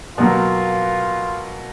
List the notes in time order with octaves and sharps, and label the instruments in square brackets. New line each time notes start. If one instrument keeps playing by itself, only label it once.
[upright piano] B2 F#3 A#3 [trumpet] F4